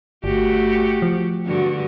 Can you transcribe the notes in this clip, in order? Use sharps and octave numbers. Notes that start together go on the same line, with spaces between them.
G1 A3 F#4 G4
F3
G2 D3 F#4